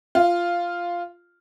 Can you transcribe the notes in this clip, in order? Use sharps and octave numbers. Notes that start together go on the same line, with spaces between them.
F4